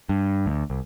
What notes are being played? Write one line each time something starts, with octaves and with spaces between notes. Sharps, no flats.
G2
D2
C2